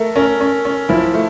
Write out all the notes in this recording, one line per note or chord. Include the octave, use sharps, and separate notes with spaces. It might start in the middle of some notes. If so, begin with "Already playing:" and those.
Already playing: A3 A4 A#4
C#4 A#4
C#4
C#4
F3 E4
A3